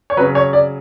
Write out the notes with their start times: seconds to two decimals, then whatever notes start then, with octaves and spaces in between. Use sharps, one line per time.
0.10 C#5
0.17 C#3 F#3 B4
0.35 C#5
0.53 D5